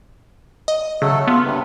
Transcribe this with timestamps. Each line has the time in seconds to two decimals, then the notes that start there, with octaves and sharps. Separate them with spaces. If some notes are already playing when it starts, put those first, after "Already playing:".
0.68 D#5
1.02 C#3 F#3 A3 A4
1.27 B3 F4
1.44 G2 C3